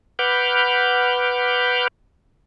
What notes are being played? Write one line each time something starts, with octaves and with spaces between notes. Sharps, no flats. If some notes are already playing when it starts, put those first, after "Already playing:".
B4 F#5 B5 D6 F6 G6